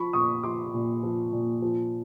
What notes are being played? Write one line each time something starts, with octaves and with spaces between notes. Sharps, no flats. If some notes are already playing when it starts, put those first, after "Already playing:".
Already playing: F3 B5 C#6
A#2 C#6 D#6
F3 C6 D6
A#2
F3
A#2
F3